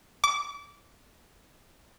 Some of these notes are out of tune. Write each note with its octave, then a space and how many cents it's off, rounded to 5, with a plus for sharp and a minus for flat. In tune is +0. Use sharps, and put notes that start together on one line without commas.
D6 -25